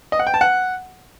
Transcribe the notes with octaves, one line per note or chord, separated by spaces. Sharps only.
D#5
F#5
G5
A5
F#5